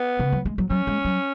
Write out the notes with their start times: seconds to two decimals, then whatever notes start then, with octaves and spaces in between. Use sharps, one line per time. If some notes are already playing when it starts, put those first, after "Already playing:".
Already playing: B3
0.19 C#3
0.32 F#3
0.45 G#3
0.58 F#3
0.70 F#3 C#4
0.87 G#3
1.05 F#3